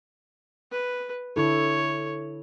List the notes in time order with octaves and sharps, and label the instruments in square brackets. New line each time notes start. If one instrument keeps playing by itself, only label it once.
[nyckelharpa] B4
[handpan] D3 E4 A4 [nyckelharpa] C#5